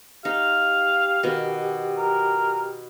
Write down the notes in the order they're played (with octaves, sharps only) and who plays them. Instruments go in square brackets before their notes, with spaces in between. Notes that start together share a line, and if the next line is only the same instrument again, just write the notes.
[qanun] D#4 [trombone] G4 [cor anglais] F5
[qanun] B2 D#3
[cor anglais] A#4